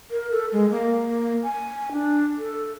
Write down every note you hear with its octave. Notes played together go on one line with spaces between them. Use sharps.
A#4
A4
G#3
A#3
G#5
D4
A4